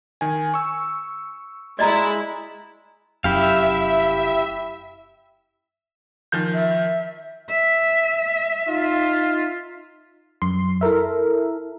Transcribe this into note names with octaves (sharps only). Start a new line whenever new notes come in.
D#3 G#5
C#6 E6
G#3 E4 D5 D#5 A#5
F1 F#2 E4 G4 E5 F5
D#3 F3 G6
E5
E5
D#4 F4
F#2 C6
E4 A4 A#4 E5